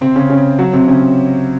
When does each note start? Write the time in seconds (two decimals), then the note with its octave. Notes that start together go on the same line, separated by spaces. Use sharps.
0.01 C3 C4
0.16 C#3 C#4
0.30 C#3 C#4
0.59 F#3 F#4
0.73 C3 C4
0.87 C#3 C#4